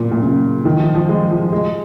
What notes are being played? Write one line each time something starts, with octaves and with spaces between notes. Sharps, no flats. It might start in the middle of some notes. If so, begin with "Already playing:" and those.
Already playing: A#2
A#2
C#3
D#3
F3
F3
G#3
F3
G#3